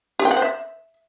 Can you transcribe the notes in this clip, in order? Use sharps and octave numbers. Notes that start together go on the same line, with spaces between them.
G4
G5
F#5
C5
E5